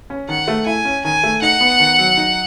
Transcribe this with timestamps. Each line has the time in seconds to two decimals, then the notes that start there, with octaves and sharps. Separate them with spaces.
0.10 C#4
0.28 D#3 F#5
0.48 A3
0.66 E4 G#5
0.85 C#4
1.05 D#3 G#5
1.24 A3
1.42 D#4 F#5
1.61 B3
1.80 D#3
1.99 F#3
2.17 D#4